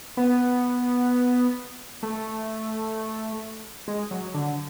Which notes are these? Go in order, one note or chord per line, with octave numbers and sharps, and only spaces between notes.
B3
A3
G#3
F#3
D3